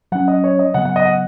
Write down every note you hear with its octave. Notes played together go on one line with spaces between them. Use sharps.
F#3 C#4 F#5
D#5
C#5
D#5
C#3 F#3 B3 F#5
F#5
D#5
F#5